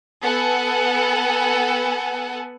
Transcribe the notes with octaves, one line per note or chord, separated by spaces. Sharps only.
B3 A4 F#5 G#5